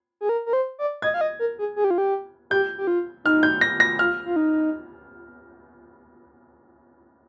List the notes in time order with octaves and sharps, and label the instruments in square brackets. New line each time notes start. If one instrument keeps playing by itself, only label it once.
[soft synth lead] G#4
A#4
A#4
C5
D5
[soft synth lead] D#5 [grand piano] G#6
[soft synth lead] F5
D#5
A#4
G#4
G#4
G4
F4
G4
[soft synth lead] G4 [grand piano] G6
[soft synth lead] G4
F4
[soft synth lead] D#4 [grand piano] F6
[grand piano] G6
A#6
A#6
[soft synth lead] F4 [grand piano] F6
[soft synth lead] F4
D#4